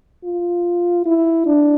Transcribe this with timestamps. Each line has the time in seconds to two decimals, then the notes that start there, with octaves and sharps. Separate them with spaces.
0.25 F4
1.06 E4
1.46 D4